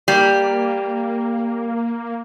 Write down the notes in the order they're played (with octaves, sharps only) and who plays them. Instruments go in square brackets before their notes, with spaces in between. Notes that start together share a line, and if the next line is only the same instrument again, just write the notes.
[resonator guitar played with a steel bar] G3 [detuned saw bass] A#3